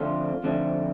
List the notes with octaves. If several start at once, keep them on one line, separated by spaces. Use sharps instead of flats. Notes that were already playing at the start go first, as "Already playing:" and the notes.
Already playing: F2 D3 A3 C4 F4
F2 D3 A3 C4